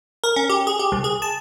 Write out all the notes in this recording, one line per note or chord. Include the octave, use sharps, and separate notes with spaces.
A#4
C#4
G4
G#4
G4
C2
G#4
A5